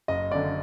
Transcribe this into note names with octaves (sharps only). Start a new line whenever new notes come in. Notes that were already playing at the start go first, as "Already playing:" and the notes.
F#1 D#5
F#2 D3 D5